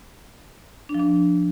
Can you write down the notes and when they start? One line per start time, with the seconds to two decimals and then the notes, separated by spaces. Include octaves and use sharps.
0.89 D4
0.94 F3
1.00 D4